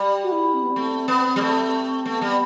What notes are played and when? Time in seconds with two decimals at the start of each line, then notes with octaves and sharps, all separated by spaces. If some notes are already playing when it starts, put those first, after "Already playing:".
Already playing: G3
0.23 F#4
0.32 E4
0.54 C4
0.63 B3
0.71 A3 C4
1.08 B3
1.36 G3
1.41 A3
2.05 A3 B3
2.21 G3